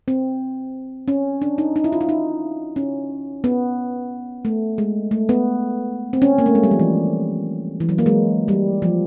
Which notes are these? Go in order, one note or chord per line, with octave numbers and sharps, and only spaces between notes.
C4
C#4
D4
D#4
D#4
E4
F4
E4
D#4
C#4
B3
A3
G#3
A3
B3
C4
C#4
A#3
A3
G#3
G3
F3
E3
E3
F#3
A#3
G#3
G3
F3